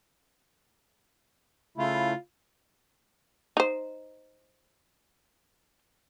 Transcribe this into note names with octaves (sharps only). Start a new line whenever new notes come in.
C#3 A3 E4 F4
D#4 C5